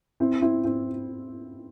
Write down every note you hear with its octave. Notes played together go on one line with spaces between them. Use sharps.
C4 E4
C4 E4
C4 E4